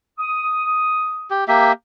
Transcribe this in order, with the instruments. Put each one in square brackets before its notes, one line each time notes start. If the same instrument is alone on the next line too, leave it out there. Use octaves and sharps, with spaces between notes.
[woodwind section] D#6
[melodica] G4
A#3 G4 E5